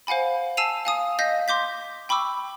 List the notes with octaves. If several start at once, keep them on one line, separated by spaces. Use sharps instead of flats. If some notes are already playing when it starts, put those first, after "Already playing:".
C5 F5 F#5 G#5 B5
G#5 A5 E6 C7 D#7 F7
F5 G#5 D#6
D#5 F5 G6 A#6 B6
C6 D6 G6 B6
G5 B5 C#6 D6 E6